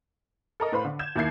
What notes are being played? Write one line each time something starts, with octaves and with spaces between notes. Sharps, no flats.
A4 A#4 D#5
A2 B4 C5 F5 B5
D3
G6 G#6 E7
D#2 A#3 E4 G6 G#6 C7